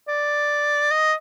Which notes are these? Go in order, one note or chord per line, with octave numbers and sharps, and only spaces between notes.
D5
D#5